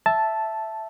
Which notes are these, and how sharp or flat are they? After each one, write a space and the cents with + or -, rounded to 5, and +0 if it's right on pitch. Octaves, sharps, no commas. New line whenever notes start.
E5 +0 A5 -5